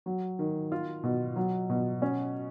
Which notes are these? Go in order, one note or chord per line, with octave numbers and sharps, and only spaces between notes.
F#3
D#3
F4
B2
F#3
B2
C#4